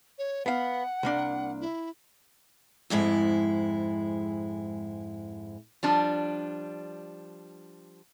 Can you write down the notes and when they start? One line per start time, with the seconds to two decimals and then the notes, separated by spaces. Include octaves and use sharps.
0.19 C#5
0.46 B3 F5 F#5
1.03 C2 A#3 D4
1.61 E4
2.90 F2 G#2 G#3 E4
5.83 F3 G3 D4